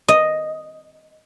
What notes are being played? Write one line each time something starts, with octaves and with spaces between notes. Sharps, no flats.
D#5